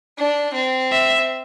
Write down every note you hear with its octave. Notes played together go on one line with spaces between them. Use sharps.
D4
C4
E5